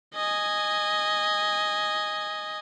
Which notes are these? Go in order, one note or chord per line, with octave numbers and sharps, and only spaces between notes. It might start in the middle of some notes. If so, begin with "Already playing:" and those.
D#5 G#5